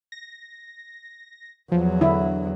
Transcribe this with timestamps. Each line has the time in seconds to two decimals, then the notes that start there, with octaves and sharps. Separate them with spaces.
0.12 A#6
1.72 E2 F3 F#3
2.01 D3 E4